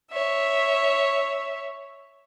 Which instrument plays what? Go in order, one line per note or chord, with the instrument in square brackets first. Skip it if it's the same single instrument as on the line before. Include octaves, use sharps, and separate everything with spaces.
[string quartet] C#5 E5